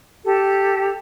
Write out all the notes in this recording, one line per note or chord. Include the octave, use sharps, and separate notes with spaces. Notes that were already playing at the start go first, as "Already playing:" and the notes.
G4 A4